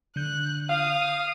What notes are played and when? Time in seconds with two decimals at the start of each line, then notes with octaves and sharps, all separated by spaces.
0.16 D3 F#6 G6
0.69 F5 D#6